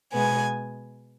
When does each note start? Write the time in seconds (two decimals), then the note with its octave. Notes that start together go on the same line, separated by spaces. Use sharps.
0.14 B2 G#3 B3 G#5